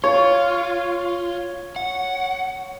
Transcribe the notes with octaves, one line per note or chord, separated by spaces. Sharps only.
F4 C#5
F#5